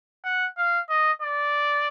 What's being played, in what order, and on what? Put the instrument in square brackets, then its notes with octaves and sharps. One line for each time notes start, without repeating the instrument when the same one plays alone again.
[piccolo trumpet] F#5
F5
D#5
D5